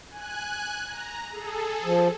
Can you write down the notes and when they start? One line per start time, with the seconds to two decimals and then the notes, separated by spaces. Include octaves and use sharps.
0.10 G#5 F#6
0.87 A#5
1.30 G#4 A4
1.84 F3